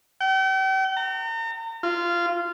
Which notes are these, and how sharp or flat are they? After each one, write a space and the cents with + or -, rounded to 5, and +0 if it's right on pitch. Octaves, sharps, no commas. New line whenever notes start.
G5 -40
A#5 -40
F4 -15